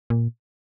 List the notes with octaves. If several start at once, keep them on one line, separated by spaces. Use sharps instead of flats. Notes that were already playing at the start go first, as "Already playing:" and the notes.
A#2